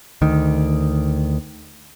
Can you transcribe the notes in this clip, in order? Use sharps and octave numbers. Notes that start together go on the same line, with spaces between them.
D2 D#3